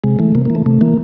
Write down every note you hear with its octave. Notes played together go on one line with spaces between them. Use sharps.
C3 G#3
E3 A3
C3 A#3
E3 A#3
A3
C3 A3
E3 A#3